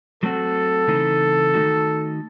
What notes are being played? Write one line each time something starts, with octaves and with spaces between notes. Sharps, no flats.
F#3 A3 C4 F#4 A4
C#3 E3 A3 C4 D#4
D#3 A3 D#4 F#4